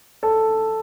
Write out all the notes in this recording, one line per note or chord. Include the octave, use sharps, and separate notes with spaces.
A4